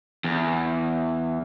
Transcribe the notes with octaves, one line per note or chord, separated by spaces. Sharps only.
E2